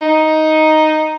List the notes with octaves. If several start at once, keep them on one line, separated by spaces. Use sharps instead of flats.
D#4